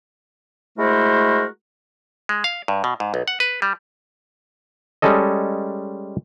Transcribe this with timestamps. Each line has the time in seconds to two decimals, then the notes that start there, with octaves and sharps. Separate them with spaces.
0.78 G#3 A3 E4 F#4 A#4 C5
2.29 G#3
2.44 F5
2.68 G2
2.84 B2
3.00 G#2
3.14 B1
3.28 F#5
3.40 B4
3.62 G3
5.02 G3 G#3 C#4 A4 D#5